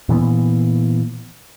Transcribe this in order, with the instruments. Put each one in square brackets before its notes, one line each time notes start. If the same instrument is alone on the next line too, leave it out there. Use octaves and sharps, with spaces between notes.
[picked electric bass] A#2 E3 B3